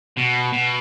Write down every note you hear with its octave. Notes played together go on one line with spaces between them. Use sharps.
B2
B2